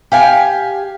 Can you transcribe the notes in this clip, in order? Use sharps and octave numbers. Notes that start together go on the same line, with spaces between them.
G4 F5 G#5